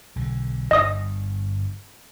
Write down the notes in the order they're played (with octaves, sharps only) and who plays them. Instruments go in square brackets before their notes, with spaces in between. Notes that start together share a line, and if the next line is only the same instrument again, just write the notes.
[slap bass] B1 D3
[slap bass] G1 G2 G3 [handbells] D#5 D#6